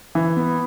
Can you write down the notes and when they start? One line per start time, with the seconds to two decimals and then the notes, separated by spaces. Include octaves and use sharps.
0.15 E3
0.37 B3